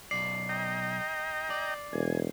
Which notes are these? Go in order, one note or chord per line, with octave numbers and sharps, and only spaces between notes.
B1 D5 C7
D#5 G5 A#5
D5
E1 G#5